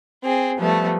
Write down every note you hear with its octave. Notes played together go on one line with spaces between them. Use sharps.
C4 G#4
F3 G3 A3 B3